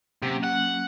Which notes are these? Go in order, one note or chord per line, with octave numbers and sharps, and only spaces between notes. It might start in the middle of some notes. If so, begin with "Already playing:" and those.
C3 F#3 A#3 C#4
F#5